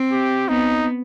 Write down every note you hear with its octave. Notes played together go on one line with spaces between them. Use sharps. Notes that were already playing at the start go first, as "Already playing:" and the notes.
Already playing: C4
G4
B3 D#4